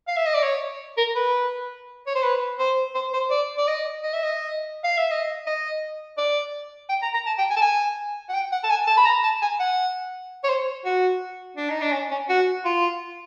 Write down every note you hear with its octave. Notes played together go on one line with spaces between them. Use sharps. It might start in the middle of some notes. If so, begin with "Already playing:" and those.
F5
E5
D#5
D5
C#5
A#4
B4
C#5
C5
B4
C5
C5
C5
D5
D5
D#5
D#5
E5
D#5
F5
E5
D#5
D#5
D5
G5
A#5
A#5
A5
G5
G#5
A5
G#5
F#5
G5
F#5
A5
G#5
A5
B5
A#5
A5
G#5
F#5
C#5
C5
F#4
D4
D#4
D4
C#4
C#4
F#4
F4